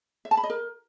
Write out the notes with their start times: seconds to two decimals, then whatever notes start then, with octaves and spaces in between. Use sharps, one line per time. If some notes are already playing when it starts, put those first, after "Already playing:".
0.25 E5
0.31 A5
0.37 B5
0.44 D#5
0.50 A#4